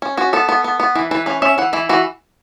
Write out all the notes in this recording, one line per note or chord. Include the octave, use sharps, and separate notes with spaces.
C#4
C#4 F#4
B3 A4
B3
B3
B3
E3 B4
E3 B4
C#4 B4
C#4 E5
E3 F#5
E3 E4
E3 F#4